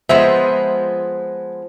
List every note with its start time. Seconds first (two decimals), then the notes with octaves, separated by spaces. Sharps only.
0.09 F3 G#3 B3 C5 E5